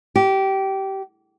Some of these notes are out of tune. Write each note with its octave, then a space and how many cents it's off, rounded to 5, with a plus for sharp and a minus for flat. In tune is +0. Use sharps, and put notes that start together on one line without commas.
G4 -20